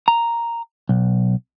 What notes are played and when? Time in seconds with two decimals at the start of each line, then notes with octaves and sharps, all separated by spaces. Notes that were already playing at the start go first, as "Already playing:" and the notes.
0.08 A#5
0.89 B1